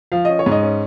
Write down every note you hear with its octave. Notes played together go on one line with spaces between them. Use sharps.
F3 F5
C#4 D#5
C#5
G#2
D#5
C#4